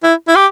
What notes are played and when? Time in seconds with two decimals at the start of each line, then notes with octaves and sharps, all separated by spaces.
0.03 E4
0.28 E4
0.36 G4